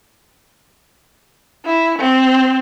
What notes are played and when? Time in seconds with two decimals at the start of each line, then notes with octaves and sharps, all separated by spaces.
1.65 E4
1.99 C4